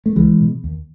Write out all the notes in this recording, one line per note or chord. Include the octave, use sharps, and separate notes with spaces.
A3
C#2 E3 G#3
B2
D#2